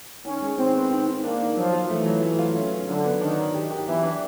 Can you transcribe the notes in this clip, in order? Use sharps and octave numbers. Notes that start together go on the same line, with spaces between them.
D#3 C#4
G#3
D#3 C4
B3
D#3
D#3
A#3 D4
D#3
F3 F#3
F4
E3 A3
F#3
A3
F4
C#4
C#4
D3 F#3
B3
D#3 D4
F#3
G4
G4
E3 B3
D4